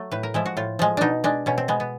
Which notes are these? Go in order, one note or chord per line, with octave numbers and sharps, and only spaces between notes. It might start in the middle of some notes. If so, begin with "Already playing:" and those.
Already playing: F#3 A3
A2 B4
A#4
F3 G#3 E4
F#4
A2 F4
F3 G#3
B2 D4 D#4
G#3 D4
B2 C#4
C4
G#3 B3
B3